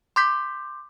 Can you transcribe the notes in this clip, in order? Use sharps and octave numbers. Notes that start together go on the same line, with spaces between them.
C6 D6 G6 B6